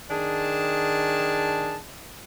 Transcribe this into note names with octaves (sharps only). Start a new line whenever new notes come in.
D#3 D4 G#4 A5